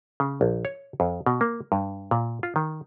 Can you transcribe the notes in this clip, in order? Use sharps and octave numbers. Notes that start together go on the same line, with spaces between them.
C#3
A#1
C#5
F2
B2
A#3
G2
A#2
F4
D#3